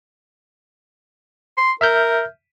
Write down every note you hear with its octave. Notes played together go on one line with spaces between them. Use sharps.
C6
A#4 E5 F6 G6